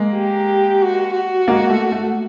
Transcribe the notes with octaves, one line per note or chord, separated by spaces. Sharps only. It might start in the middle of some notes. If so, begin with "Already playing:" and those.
Already playing: G#3 A#3
G4
F#4
F#4
G#3 A#3
A3
A3